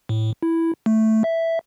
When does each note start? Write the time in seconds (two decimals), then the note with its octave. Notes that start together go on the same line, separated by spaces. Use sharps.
0.09 A2
0.43 E4
0.86 A3
1.24 E5